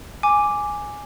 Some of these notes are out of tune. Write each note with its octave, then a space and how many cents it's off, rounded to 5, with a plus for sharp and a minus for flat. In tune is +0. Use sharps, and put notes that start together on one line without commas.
G#5 +0 D6 +0